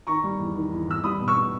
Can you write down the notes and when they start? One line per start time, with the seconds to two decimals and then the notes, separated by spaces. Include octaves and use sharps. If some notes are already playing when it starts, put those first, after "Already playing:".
0.07 D#3 A#5 C#6
0.23 G3
0.40 E2
0.55 D#3
0.71 E2
0.88 E2 E6
1.04 G3 B5 D#6
1.20 B2
1.28 C#6 E6
1.35 B2